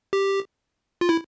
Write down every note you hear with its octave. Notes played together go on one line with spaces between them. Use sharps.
G4
F4
E4